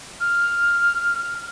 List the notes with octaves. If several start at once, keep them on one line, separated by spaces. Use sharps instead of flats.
F6